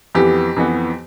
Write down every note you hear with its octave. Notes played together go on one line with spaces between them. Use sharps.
F2 E3 B3 G4
F2 E3 B3